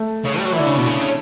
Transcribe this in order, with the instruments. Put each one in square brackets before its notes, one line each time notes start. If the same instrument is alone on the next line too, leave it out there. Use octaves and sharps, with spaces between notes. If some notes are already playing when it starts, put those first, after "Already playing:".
Already playing: [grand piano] A3
[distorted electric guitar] C#3
G3
F#3
E3
[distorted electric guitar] D3 [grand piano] E4
[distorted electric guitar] C#3 [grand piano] D4
[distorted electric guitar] B2
C#3
C#4